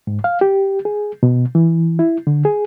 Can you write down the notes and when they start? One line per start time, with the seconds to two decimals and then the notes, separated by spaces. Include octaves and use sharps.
0.07 G#2
0.24 F5
0.41 G4
0.85 G#4
1.23 B2
1.55 E3
1.99 E4
2.27 D3
2.45 G#4